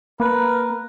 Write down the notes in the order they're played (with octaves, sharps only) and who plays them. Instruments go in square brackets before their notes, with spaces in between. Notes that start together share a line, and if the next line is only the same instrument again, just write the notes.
[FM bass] A#3 [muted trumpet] A#4 [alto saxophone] B4